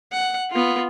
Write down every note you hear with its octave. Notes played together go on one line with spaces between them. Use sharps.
F#5
B3 F4